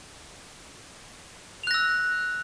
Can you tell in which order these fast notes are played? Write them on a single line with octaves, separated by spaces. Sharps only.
F7 F#6 A#6 E6